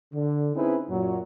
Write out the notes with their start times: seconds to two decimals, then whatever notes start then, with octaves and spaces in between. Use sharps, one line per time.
0.14 D3
0.56 C4 C#4 D#4 E4 G#4 B4
0.89 F#2 A#2 F#3